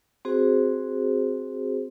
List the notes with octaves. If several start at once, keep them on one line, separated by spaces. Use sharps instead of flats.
C4 F#4 G#4 C5